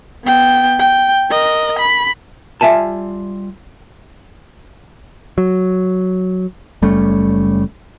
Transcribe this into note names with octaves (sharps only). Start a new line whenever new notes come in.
B3 G5
G5
A#4 D#5
B5
G3 F4 E5 G#5 A5
F#3
F#1 G3 A3 C#4